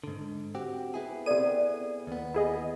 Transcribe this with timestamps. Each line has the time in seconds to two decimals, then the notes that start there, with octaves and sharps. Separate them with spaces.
0.04 G#2 D3
0.55 C4 F#4 G4
0.94 B3 E4 G#4
1.26 C3 A4 D5 D#7
2.07 D#2 B3
2.34 E4 G#4 D#5